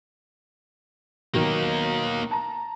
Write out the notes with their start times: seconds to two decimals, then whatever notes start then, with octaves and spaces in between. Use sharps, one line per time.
1.34 B2 D#3 F#3 A#3 D#4
2.31 A5 A#5